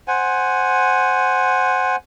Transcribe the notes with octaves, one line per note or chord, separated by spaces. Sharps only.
C5 F#5 G#5